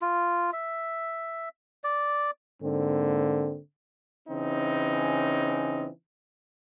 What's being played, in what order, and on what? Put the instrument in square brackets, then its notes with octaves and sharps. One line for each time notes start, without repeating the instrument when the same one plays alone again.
[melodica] F4
E5
D5
[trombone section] G#2 D3 A#3 C4
C#3 E3 C4 C#4 D#4